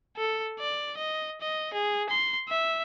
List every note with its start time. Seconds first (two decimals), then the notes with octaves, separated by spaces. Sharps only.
0.17 A4
0.60 D5
0.97 D#5
1.41 D#5
1.74 G#4
2.09 C6
2.49 E5